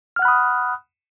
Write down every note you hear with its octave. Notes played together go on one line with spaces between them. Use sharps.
F#5 B5 D#6 F6 F#6